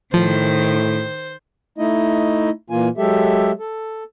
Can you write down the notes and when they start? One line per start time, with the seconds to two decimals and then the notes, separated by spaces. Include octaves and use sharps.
0.14 A2 D#3 F3 C5
1.78 A3 D#4 E4 D#5
2.70 A#2 E3 A#3 F4 G#5
2.97 F#3 G#3 G4 A4 E5
3.59 A4